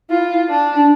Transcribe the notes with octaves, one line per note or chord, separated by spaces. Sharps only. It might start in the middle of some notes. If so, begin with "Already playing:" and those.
E4 F4
D4
D4